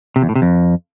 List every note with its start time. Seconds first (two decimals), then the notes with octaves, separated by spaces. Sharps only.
0.16 C3
0.22 E2
0.29 A2
0.36 C3
0.42 F2